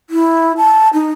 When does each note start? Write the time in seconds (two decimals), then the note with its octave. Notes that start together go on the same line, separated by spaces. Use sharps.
0.10 E4
0.57 A5
0.93 D#4